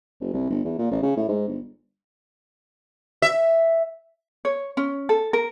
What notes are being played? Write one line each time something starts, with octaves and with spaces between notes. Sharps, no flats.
F#1
C2
G1
E2
A#2
A1
C#3
A2
G#2
G1
E5
C#5
C#4
A4
A#4